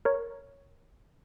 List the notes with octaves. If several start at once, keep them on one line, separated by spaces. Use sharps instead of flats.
A#4 C#5